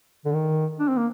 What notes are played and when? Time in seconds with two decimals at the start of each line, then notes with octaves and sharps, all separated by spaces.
0.25 D3
0.34 D#3
0.79 D4
0.88 C4
0.97 A#3